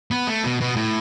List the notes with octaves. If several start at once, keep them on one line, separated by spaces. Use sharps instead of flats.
B3
A3
B2
B2
A2